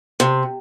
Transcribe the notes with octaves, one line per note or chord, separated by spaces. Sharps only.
C3